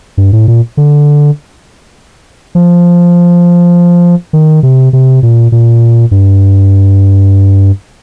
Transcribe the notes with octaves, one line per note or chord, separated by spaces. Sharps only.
G2
A2
A#2
D3
F3
D#3
C3
C3
A#2
A#2
G2